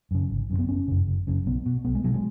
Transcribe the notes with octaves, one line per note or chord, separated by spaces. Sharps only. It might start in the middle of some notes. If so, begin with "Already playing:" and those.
F#2 C#3
G#1
F#2 C#3
B3
F#1 C#4
F#2 C#3
F#1
F#2 C#3
B1 B3
B2
B1 B3
G#3
B2 F#3
G#3